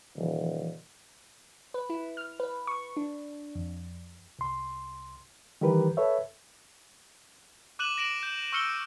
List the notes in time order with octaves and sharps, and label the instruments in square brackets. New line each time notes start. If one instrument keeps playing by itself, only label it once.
[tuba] D#1 [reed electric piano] C#3 E3 F3
[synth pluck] B4
E4
F6
B4
C#6
D4
F2
[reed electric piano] C2 C6
D#3 E3 G3 G4 A#4 B4
A4 B4 C#5 E5
[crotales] D6 F#6 D#7 E7 F#7
A#6 D7 E7 F#7
G6
C#6 E6 F6 C#7 D7 G7